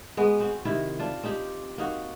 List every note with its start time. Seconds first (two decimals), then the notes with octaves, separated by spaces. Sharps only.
0.17 G#3 B3 F#4
0.40 C4 F#4
0.65 C3 D#3 E4
0.99 D4 F4
1.23 C4 D#4 G4
1.78 A#3 D#4 F#4